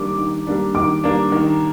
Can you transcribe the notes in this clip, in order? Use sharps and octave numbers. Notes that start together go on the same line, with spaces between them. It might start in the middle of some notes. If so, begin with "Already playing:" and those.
Already playing: D#3 G3 A#3 D4 D6
D#3
G3 A#3 D4
D#3 D6
G3 A#3 D4
D#3